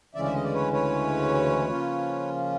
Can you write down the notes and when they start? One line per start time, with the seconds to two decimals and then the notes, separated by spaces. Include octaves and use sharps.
0.15 D2 C#3 E3 G#3 C#4 D5 E5
0.25 E5
0.34 D#5
0.44 D5
0.54 B4 C#5
0.73 B4 C#5
1.69 C#3 F3 A#3 C#4 F4